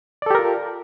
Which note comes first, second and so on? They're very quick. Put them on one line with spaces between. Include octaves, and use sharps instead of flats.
D5 A4 G4 A#4 F4